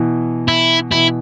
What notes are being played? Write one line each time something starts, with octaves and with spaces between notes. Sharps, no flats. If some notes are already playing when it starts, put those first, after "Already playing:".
Already playing: B2 E3
E4
B2 E3 E4